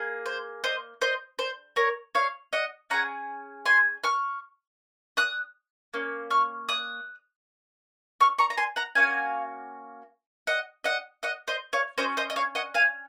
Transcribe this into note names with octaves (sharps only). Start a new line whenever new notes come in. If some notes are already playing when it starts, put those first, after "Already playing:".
Already playing: A#3 G#4
C5
C5 D#5
C5 D#5
C5
A#4 C#5
C#5 F5
D#5 F#5
C#4 G#4 F#5 A#5
G#5 C6
C#6 F6
D#6 F#6
A#3 C#4
C#6 F6
D#6 F#6
C#6 F6
A#5 C#6
A#5
G#5 C6
F#5 A#5
A#3 C#4 F#4 F5 G#5
D#5 F#5
D#5 F#5
D#5 F#5
C5 D#5
C#5 F5
C#4 F#4 C5 D#5
C5 D#5
D#5
C#5 F5
D#5 F#5
F5 G#5